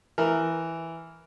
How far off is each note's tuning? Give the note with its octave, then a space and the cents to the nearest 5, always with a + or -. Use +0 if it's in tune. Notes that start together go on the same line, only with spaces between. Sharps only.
E3 +0 A#4 +0